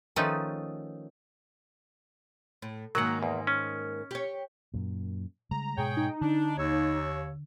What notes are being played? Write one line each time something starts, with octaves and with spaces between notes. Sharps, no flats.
D#3 F3 A3 C#4 D#4 B4
A2
G#2 D#3 F#3 A#3 F#5
E2
C#4
G4 C#5
F#2 A#2
C#3 G3 G#3 A#5
G#2 B2 G#3 G#4 C#5 G5
D#4
D3 D4
D#2 C#5 E6